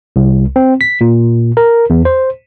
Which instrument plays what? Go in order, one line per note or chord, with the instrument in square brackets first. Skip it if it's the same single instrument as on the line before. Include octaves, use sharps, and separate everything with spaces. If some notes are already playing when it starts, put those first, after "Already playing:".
[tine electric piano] C2
C4
B6
A#2
A#4
E2
C5